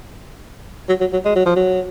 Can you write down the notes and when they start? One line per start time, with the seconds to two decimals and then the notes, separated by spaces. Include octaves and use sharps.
0.89 F#3
1.00 F#3
1.13 F#3
1.25 G#3
1.36 F#3
1.46 F3
1.56 F#3